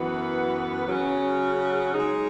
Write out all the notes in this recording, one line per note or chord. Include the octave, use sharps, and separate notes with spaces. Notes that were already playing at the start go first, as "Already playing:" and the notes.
Already playing: F#2 E3 B3 F#4 B4
C#3 F#3 C#4
G#3 D#4 G#4